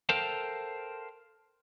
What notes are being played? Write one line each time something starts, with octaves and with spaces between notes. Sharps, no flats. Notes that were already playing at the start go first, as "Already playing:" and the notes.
A4 A#4 C5 F5 G5 A5